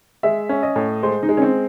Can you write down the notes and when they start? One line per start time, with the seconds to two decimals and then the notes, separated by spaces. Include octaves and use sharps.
0.23 G#3 E5
0.49 C#4
0.63 D#5
0.76 A2
1.03 G#3 C5
1.23 D#4
1.29 G#3
1.37 C#4
1.42 C4